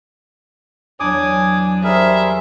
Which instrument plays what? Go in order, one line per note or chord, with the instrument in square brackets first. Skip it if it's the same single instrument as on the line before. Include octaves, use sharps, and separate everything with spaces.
[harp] E2 F#3 [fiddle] D4 [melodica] G#5 D6 D#6
[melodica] G3 G#4 A#4 [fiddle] C5 E5